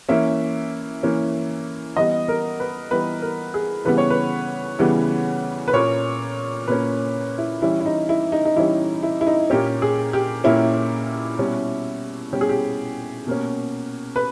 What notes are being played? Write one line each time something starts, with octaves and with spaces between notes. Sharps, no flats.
E3 A#3 C#4 E5
E3 A#3 C#4
E3 G3 B3 D#5
A#4
B4
E3 G3 B3 B4
A#4
G#4
C#3 E3 G3 B3 B4
C#5
B4
C#3 E3 G3 B3
B4
A#2 A#3 C#4 C#5
A#2 A#3 C#4 B4
E4
E3 G3 C#4 E4
E4
D#4
E4
D#4
D#4
E3 G3 C#4 E4
E4
E4
D#4
A#2 A#3 C#4 G4
G#4
G4
A#2 A#3 C#4 E4
B2 G3 C#4
B2 G3 C#4 G4
G#4
G4
B2 A#3 C#4
B4